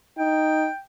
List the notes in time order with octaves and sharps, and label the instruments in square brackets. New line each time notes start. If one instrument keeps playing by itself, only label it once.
[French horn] D#4 [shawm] G5